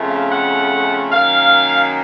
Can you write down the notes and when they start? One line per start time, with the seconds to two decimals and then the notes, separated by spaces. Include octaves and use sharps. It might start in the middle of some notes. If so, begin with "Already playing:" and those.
Already playing: F2 C#3 A3
0.08 F5
0.30 F#5
1.12 F#2 D#3 A#3 F5